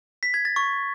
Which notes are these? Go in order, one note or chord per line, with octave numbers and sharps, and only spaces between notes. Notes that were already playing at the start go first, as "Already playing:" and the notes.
B6
G#6
A6
C#6